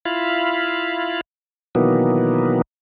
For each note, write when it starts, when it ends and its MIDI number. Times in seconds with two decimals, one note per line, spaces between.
0.05 1.21 64
0.05 1.21 65
0.05 1.21 77
0.05 1.21 83
1.75 2.62 47
1.75 2.62 51
1.75 2.62 52
1.75 2.62 54
1.75 2.62 58
1.75 2.62 59